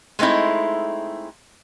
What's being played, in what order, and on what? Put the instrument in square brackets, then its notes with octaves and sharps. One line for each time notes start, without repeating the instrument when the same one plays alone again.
[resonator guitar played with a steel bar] G#3 A3 C4 D#4 E4